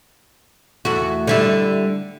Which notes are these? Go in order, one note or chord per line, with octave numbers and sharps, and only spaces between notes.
E2 A3 F#4
D3 G3 E4